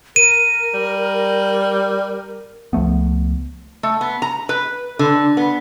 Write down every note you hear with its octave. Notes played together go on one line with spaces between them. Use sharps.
A#4 D#7
G3
C#2 F3 A3 B3
A3
B3
A#5
B4
D3
B3